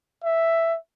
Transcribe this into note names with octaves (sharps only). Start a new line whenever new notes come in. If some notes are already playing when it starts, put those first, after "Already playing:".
E5